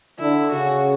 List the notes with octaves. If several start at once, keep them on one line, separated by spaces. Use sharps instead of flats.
D3 E4
C#3 F#4